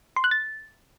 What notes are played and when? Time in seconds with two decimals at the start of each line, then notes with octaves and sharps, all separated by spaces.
0.16 C6
0.24 F#6
0.31 A6